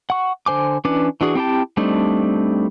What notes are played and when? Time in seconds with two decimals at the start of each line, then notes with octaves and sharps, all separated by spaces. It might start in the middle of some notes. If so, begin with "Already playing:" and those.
0.10 F#5 C#6
0.46 D3 C5 G#5 D6
0.85 E3 C#4 D4 B4 D6
1.21 E3 D4 F#4 G#4
1.35 C4 E4 G4 G5 A5
1.77 G3 A3 C4 D4 D#4